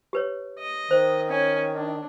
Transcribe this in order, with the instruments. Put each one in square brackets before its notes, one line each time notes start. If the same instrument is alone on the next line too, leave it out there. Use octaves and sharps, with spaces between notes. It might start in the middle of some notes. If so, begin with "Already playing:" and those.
[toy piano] G4 B4 C#5
[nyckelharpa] D#5
[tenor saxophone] D#3 [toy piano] C5
[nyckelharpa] C#4 G#5
D4